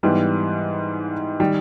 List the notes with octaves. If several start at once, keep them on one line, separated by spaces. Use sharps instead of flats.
G#2 E3 G3 B3
D#3 G3